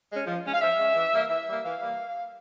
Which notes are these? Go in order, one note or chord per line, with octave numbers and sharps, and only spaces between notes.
G#3 C#4
F3
G#3 C#4
F5
F3 E5
G#3 C#4
E3
G3 A#3
E3 E5
G3 A#3
E3 F5
G3 A#3